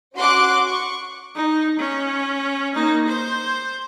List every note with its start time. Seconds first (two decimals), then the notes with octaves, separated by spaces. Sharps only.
0.17 C#4 F#4 C6 D6 F#6
0.67 C#6
1.35 D#4
1.79 C#4
2.74 A#3 D#4
3.08 C5